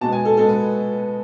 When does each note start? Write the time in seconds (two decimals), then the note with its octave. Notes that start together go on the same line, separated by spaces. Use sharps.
0.01 B2 G#3 B3 A5
0.12 G#5
0.25 A4
0.36 B2 G#3 B3 A4
0.49 B4